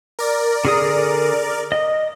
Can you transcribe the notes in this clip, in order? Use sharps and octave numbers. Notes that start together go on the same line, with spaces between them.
A#4 D5
D3 G#4 D#6
D#5